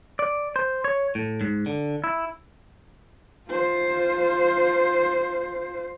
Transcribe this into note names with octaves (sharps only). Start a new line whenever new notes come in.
D5
C5
C#5
A2
G#2
D3
E4
F4 C5